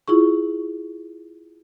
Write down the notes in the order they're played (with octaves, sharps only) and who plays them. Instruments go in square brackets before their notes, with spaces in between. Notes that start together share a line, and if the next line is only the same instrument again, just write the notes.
[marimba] E4 F4 G#4 C#6